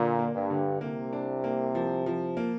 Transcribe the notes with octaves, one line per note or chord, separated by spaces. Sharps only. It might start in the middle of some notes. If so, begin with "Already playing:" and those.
Already playing: A#2 D3
A#3
G2
D3
C2 C3 A#3
D4
A#3
F3
F3
A#3